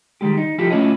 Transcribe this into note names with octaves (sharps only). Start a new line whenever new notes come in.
D#3 G3 G#3 G4
D#4
F3 E4 F4 G4 A4
A3 C#4 E4 F4 C#5 D#5